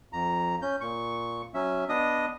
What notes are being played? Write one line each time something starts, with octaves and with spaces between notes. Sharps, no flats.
F2 A#5
C#4 G6
A#2 C#6
F#3 C#4 E5
B3 D4 D#5 D#6